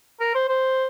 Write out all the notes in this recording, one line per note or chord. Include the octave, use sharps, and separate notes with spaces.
A#4
C5
C5